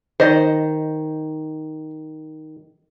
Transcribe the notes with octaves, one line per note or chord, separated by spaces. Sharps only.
D#3 C5 D#5